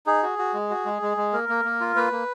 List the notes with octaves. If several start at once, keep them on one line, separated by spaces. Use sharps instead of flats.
D#4 G#4
F#4
F#4
G#3
F#4
G#3
G#3
G#3
A#3 A#4
A#3
A#3
F4
A#3 B4
A#3